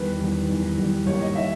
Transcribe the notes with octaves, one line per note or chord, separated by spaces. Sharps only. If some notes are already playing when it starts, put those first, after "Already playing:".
Already playing: E2 D#3 G3 B4
E2 D#3 G3
E2 D#3 G3
E2 D#3 G3
D#2 D#3 G3 C#5
D#5
D#3 E5